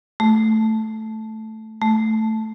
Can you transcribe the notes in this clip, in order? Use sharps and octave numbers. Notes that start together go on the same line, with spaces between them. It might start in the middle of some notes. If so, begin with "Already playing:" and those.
A3
A3